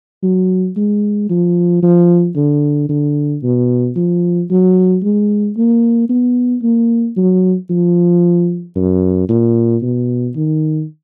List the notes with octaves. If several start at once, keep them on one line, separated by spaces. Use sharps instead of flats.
F#3
G#3
F3
F3
D3
D3
B2
F3
F#3
G#3
A#3
B3
A#3
F#3
F3
F#2
A#2
B2
D#3